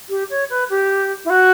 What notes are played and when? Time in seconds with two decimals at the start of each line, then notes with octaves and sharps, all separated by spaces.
0.09 G4
0.30 C#5
0.50 B4
0.70 G4
1.25 E4
1.30 F#4